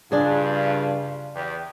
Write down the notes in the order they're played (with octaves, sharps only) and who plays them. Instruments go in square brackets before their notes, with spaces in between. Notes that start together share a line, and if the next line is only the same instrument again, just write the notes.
[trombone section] G2 F4 [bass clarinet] C#3 [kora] D4 G#4
[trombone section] E2 G4